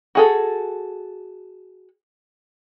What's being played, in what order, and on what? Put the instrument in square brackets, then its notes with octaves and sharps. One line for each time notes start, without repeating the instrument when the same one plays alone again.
[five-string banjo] F#4 G#4 A4